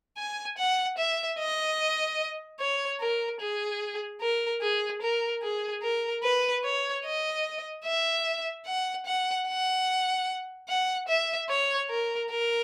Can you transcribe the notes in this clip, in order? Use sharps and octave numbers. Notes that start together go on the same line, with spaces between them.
G#5
F#5
E5
D#5
C#5
A#4
G#4
A#4
G#4
A#4
G#4
A#4
B4
C#5
D#5
E5
F#5
F#5
F#5
F#5
E5
C#5
A#4
A#4